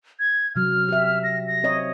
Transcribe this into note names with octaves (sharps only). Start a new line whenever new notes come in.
G#6
C3 F#3 F6
G4 E5
A#6
A#6
C4 C#5 D#5